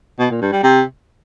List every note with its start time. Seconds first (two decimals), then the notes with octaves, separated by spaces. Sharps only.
0.19 B2
0.30 A#2
0.41 G2
0.52 G3
0.63 C3